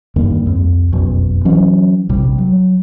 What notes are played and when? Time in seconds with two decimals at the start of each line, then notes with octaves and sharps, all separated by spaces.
0.16 G2 D#3 G3 A#3
0.45 C2 F2
0.92 F#1 B1 F2
1.45 E3 F#3 C#4
2.09 A#1 C3 G3
2.38 F#3